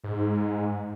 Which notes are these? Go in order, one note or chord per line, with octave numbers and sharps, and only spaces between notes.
G#2